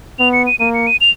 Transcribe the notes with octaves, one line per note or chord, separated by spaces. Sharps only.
B3 F7
C#7
D#7
A#3 D#7
C#7
D#7
F7